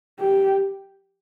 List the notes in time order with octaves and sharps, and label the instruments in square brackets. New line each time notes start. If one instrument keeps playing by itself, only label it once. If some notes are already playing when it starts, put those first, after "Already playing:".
[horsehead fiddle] G4